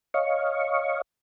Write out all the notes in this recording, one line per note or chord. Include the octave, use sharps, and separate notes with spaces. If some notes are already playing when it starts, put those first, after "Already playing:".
C#5 D#5 F5 C#6